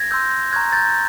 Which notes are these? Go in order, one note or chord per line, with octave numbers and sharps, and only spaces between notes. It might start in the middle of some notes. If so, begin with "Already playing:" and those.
Already playing: G#6 A#6
C6 E6 G6
A#5 C#6 F#6 G#6
G6 A6